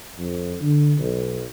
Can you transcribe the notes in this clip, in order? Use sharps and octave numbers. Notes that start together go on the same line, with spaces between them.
F2
D3
B1